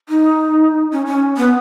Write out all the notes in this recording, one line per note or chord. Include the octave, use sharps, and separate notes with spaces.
D#4
C#4
C#4
B3